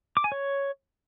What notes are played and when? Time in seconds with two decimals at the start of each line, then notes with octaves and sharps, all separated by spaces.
0.17 D6
0.24 G#5
0.32 C#5